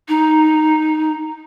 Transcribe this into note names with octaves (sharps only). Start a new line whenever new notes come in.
D#4